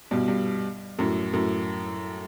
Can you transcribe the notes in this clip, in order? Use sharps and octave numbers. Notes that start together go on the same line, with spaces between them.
G2 B2
G2
F#2 A2
F#2 A2